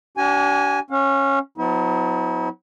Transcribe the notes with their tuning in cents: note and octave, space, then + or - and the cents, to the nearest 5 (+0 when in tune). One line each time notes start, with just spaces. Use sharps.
D4 -35 G4 -45 G#5 +0
C#4 -15 F5 +40
F#3 -35 B3 +30 E4 -40